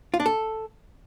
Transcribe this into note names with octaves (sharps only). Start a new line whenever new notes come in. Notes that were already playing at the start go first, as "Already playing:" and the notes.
F4
D4
A4